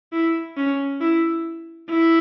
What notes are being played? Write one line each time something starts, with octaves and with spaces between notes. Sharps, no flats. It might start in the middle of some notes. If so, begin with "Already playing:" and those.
E4
C#4
E4
E4